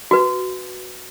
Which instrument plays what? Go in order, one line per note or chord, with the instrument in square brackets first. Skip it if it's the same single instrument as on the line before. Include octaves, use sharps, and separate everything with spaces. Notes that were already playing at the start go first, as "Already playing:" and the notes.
[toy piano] F#4 B4